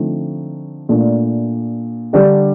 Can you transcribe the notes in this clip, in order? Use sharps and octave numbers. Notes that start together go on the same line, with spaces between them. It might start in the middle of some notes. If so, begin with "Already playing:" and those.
Already playing: D3 F3 A3 C4 D#4
A#2 A3 D4
D3 G3 D4 G4